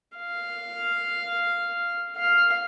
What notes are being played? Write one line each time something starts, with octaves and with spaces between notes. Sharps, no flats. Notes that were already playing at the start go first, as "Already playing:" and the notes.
F5
F5